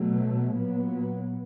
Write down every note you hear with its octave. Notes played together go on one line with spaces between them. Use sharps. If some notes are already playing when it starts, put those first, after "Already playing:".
Already playing: B2 F#3 A3
A#2 F#3 B3